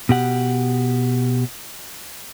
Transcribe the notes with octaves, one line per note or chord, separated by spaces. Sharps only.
B2 G4 F#5